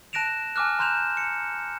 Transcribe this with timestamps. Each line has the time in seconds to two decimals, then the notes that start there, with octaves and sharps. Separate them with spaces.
0.13 A5 F#6 A#6 D7 E7 F7
0.56 G#5 A5 D6 F6 F#6
0.79 A#5 C6 F#6 G6 E7 F7
1.17 C#7